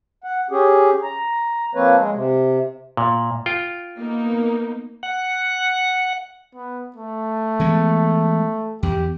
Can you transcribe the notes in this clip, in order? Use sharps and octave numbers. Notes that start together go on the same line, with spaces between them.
F#5
C#4 G4 G#4
A#5
F3 A#3 C4 B4 C#5
G#3
C3
A#2
F4 G5
A#3 B3 D#4
F#5
B3
A3
E3 G#3 B3
E2 G4